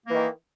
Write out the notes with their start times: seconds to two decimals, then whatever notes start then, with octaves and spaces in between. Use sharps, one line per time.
0.05 A#3
0.10 E3
0.15 D#3